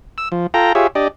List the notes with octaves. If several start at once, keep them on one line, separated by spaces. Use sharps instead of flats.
E6
F3
F4 A4 G5 A#5
F4 G4 G#4 C#5 E5
D4 G4 D5 D#5